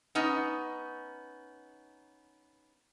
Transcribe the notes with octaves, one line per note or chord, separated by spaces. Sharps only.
B3 C#4 D#4